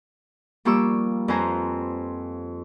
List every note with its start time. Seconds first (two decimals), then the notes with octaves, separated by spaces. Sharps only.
0.65 F3 G3 A#3 C#6 D6 E6
1.28 F2 B4 C5 G#5 A#5